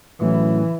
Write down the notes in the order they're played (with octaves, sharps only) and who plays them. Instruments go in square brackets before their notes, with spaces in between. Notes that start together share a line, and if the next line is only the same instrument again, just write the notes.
[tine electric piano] A2 F#3 A3 C#4 E4 [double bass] E3